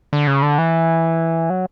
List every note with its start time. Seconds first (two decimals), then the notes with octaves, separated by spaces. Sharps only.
0.13 D3
0.27 C#3
0.42 D3
0.58 E3
1.50 F#3